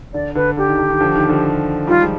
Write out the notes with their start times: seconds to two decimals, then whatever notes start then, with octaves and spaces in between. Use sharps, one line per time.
0.14 D3 D5
0.35 D3 B4
0.57 D3 G4
0.68 D#3
0.79 D3
0.90 D#3
1.01 D3 F3
1.15 D#3
1.29 D3 F3
1.87 D#3 G3 F4
2.02 F3 G#3